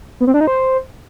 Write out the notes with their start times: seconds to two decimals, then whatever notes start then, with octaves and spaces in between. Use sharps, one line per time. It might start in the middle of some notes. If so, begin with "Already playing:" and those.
0.20 B3
0.27 C4
0.34 D4
0.41 D#4
0.47 C5